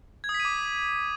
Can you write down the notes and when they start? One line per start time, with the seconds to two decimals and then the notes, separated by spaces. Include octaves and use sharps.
0.24 G#6
0.29 D#6
0.34 B6
0.40 D#7
0.45 D6